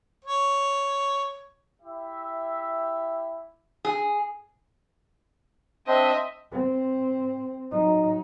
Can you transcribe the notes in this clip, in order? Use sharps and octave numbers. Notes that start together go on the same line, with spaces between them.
C#5
E4 G4 E5
G#4
C4 D4 C5 D#5 E5
C4
F#3 D#4